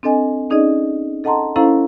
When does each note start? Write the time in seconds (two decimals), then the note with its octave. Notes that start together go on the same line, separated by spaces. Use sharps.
0.03 C4 D4 A4 D#5 G#5
0.50 C#4 D#4 G#4 D5 D#5
1.24 A4 D#5 F#5 A5 A#5 C6
1.56 C#4 E4 A4 C5 F5 A#5